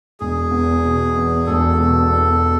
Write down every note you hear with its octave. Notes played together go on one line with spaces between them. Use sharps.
E1 G#4
E2
B2
E2
E1 A4
B2
E2